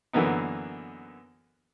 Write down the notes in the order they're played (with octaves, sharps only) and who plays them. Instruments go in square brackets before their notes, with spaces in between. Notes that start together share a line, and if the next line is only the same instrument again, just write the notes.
[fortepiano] F#2 D3 E3 A#3 B3 D#4